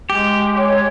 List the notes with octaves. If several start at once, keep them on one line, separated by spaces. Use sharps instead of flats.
G#3 G4
C#5